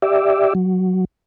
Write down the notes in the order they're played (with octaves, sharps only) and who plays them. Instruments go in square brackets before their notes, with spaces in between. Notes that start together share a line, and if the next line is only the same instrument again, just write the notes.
[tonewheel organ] G4 D5 E5
F#3